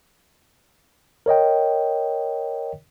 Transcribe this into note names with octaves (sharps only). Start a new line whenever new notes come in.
A#4 C#5 D#5 G5